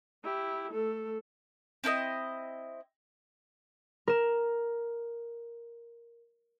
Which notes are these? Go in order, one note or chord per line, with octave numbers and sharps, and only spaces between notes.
E4 G4
A3 A4
C4 E4 A#4 D#5
A#4 E7